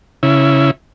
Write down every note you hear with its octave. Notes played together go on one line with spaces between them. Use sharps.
C#3 E4